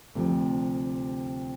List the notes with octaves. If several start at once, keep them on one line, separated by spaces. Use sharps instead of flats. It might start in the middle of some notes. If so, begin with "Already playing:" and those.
D2 C3 F3